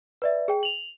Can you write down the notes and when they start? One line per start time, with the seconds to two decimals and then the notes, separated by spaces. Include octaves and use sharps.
0.22 B4 D5 E5
0.48 G#4 G5
0.63 F7 F#7